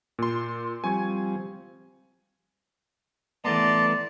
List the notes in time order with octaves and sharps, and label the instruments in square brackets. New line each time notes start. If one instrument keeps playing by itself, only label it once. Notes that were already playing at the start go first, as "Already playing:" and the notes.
[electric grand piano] A#2 C6
[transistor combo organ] F3 G3 C4 [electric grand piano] G#5 C#6 G#6
[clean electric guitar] E3 A3 B3 [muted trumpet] D5 [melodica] A5 A#5 C6